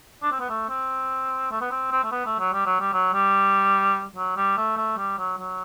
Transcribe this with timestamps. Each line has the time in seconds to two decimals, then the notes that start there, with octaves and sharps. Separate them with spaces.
0.23 D4
0.32 C4
0.40 B3
0.49 A3
0.69 C4
1.51 A3
1.61 B3
1.71 C4
1.91 C4
2.04 A3
2.12 B3
2.26 A3
2.39 F#3
2.53 G3
2.66 F#3
2.80 G3
2.93 F#3
3.14 G3
4.16 F#3
4.36 G3
4.57 A3
4.77 A3
4.97 G3
5.18 F#3
5.38 F#3